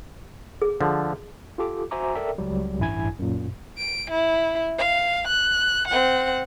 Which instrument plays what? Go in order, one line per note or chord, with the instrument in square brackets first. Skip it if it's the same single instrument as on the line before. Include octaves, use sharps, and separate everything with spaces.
[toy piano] G#4
[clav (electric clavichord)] D3 F3
[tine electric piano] F4 G4 A4 D6
F#4 C5 E5 G#5 A#5 D6
A4 A#4 D5 E5 G5
C#2 F#3 G3
A1 G2 E4 G#5 G#6
F#2 A#2
[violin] D7
E4
F5
F#6
C4 F#5